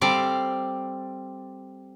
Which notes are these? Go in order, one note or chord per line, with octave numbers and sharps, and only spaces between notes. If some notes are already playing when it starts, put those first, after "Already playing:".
G3 C4 A4 D5 F5